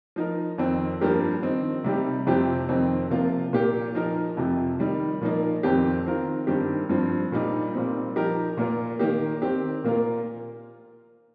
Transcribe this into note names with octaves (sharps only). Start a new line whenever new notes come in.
F3 D#4 A#4
F2 D#3 C4 D#4
G2 F3 A#3 G4 A#4
D#3 C4 D#4
C3 G3 D#4 G4
F2 C3 F3 C4 G4
F2 D#3 C4 D#4
C3 F3 A#3 F4
A#2 A#3 G4
F3 D#4 A#4
F2 C3 F3
D#3 G3 D#4
A#2 F3 A#3 D#4
F2 D#3 C4 G4
D#3 C4 F4 A#4
G2 D#3 C4 G4
G2 F3 C4
A#2 G3 D#4
A#2 G3 C4 D#4
F3 D#4 G4 A#4
A#2 A#3 F4 A#4
D#3 A#3 D#4 G4
D#3 C4 G4
A#2 A#3 F4 A#4